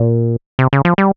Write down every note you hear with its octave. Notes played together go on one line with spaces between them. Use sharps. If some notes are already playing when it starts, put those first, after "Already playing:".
Already playing: A#2
C3
C#3
F3
G3